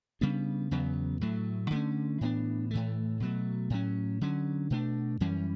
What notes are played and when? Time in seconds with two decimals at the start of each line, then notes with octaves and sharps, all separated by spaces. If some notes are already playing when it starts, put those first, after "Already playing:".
0.21 C#3 G3 B3 D4
0.71 E2 C#3 F#3 B3
1.21 A2 F#3 A3
1.70 D3 A3 C#4
2.21 A2 E3 B3 D4
2.71 A2 E3 A3
3.20 B2 F#3 A3
3.70 A2 F#3 C#4
4.21 D3 F#3 C#4
4.70 B2 A3 D4
5.20 F#2 E3 G3 C#4